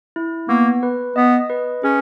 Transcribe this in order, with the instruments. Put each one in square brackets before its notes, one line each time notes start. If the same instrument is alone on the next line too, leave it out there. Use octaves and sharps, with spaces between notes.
[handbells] E4
[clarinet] A#3 [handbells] B3
[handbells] B4
[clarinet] B3 [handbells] D#5
[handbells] B4
[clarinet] C#4 [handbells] G#4